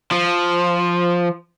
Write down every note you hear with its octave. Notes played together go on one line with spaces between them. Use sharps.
F3